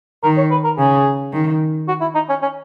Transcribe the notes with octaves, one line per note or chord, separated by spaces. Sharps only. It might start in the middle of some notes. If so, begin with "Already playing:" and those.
D#3 A#4
C#5
B4
A#4
C#3 G#4
D#3
F#4
E4
D#4
C#4
C#4